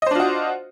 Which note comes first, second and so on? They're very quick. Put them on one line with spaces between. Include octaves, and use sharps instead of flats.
D#5 C5 D4 F4 F#4